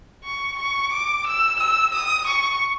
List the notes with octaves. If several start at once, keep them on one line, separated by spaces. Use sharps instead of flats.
C#6
C#6
D6
E6
E6
D#6
C#6